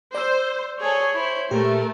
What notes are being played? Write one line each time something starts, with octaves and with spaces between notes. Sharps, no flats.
C5 D5 E6
G#4 A4 C#5
E4 C5
A#2 A3 G4 A#4